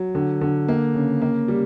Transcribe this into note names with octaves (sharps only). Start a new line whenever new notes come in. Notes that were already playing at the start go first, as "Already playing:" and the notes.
Already playing: F#3
D3
D3
A#3
C#3
A#3
G3